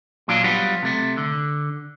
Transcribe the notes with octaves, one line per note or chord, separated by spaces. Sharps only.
A#2 F#3 D4 F4
F#3 G3 B3 F4
C3 A3
D3